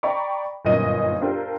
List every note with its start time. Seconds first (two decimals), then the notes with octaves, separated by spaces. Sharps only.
0.03 D5 G5 A#5 B5 C#6 D6
0.65 G1 F#2 A#2 D#4 D#5 D#7
1.21 D4 F4 G4 A4 A#4 C5